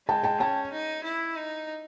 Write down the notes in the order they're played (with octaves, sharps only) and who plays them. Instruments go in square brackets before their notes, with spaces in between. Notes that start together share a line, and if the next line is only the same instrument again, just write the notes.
[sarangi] G#3 [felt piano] G5 A5
[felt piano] G5 A5
[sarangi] C#4 [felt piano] G5 A5
[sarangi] D#4
E4
D#4